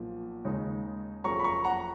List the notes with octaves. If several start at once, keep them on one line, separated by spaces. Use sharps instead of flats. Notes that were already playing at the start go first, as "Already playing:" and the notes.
Already playing: B1 A#2 F3
D#2 C#3 G#3 D#4
F#1 F2 F3 A#3 C#4 A#5 C#6
B5
A#5 C#6
F#5 A#5